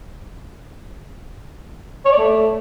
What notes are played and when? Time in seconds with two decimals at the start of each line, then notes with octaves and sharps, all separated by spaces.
2.05 C#5
2.12 D5
2.18 A3